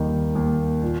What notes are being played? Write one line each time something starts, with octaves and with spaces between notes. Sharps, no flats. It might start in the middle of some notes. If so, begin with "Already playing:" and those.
Already playing: D#2 D#3 G3
D#2
A#2